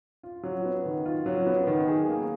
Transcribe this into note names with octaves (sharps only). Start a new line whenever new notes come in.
F4
F#3
B3
D#3
F4
F#3
B3
D#3
G#4
A#3